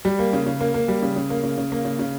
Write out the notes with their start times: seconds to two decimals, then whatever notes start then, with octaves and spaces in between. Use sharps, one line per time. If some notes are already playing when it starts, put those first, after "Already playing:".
0.05 G3
0.19 A#3
0.33 C#3
0.46 C#3
0.61 A#3
0.74 A#3
0.88 G3
1.02 C#3
1.16 C#3
1.30 A#3
1.43 C#3
1.57 C#3
1.72 A#3
1.85 C#3
1.99 C#3